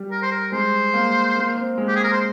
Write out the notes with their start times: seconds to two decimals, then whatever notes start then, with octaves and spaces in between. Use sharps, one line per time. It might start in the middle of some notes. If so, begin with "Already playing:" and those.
Already playing: G3
0.11 A#4
0.22 C5
0.31 A#4
0.52 G#3 C5
0.94 A#3
1.35 A#3
1.57 C4
1.78 G#3
1.88 G4
1.96 G#4
2.04 A#4
2.12 C5